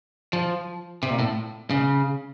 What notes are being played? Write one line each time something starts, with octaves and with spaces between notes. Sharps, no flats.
F3
C3
A#2
A2
C#3